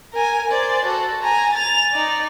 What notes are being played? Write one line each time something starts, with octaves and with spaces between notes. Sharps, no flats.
A#4 G#5
C5 D5
F#4 A4
G#5 A#5
A6 F7
D#4 D5